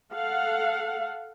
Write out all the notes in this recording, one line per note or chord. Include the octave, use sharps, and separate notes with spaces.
A4 F5 F#5